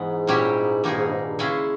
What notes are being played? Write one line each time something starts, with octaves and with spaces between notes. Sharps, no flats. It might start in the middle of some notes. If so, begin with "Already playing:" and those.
Already playing: G#2 E3 G#3 B3
A#2 G3 C#4 E4 G4
G2 D#3 A#3 D#4 G#4
G#2
G2
G#2
G2
C#3 G#3 C#4 E4 G#4